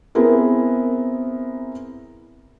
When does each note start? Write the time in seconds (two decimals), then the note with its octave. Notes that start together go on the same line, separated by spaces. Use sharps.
0.15 B3 C4 E4 G#4 A#4